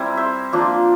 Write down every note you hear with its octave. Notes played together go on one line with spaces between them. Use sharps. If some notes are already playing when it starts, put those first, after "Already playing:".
Already playing: G3 C4 E4 A#4
C5 E5
F3 A#3 D4 F4